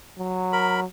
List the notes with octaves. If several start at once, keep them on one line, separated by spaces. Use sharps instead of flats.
F#3
A#4 B5